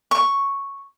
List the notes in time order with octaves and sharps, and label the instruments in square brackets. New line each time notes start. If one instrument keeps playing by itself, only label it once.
[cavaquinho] C#6